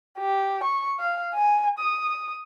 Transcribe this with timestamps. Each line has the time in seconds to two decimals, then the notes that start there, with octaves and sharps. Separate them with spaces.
0.19 G4
0.63 C#6
1.00 F5
1.34 G#5
1.79 D#6